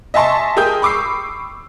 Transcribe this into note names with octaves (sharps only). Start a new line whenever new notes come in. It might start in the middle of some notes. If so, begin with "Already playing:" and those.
D#5 E5 G#5 A5 C6 C#6
G#4 A#4 G5 D#6 G6
B5 C#6 D6 E6 C7